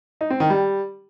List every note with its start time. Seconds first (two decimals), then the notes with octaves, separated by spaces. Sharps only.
0.21 D#4
0.30 C4
0.40 D#3
0.50 G3